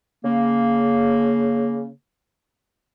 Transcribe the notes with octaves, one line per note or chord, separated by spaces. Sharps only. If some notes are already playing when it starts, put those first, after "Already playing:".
C#3 A#3